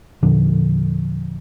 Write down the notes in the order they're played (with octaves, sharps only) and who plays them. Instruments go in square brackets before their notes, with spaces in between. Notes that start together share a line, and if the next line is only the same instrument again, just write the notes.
[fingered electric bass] E2 A#2 D3 F3